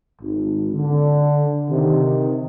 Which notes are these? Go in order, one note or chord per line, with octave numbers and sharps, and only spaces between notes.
G#1
D3
C3 D#3